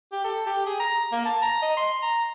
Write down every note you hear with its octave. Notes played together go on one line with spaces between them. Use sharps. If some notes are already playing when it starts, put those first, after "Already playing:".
G4
A4
G4
G#4
A#5
A#3
A5
A#5
D#5
C6
A#5